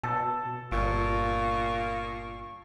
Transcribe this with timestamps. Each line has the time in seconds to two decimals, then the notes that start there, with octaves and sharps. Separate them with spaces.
0.03 B2 A4
0.72 G1 A#2 C#6